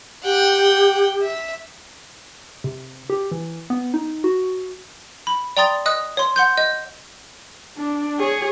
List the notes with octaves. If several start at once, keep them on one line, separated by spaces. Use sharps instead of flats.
G4 F#5 G5
E5
C3
G4
E3
B3
D#4
F#4
B5
D5 G5 A#5 C6 D#6 A6
D#5 D#6 F#6
C#5 C6
F#5 C6 G6
D#5 G6
D4
G#4 C#5